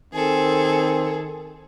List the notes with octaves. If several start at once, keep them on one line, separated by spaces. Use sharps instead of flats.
D#3 C4 G#4 A4